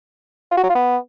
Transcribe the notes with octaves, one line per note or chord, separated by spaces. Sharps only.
F4
F#4
F#3
F4
B3